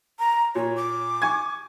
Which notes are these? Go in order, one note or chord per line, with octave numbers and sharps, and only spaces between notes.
A#5
A#2 C#5
D6
G#5 C#6 G#6